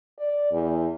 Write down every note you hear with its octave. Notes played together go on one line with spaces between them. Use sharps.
D5
E2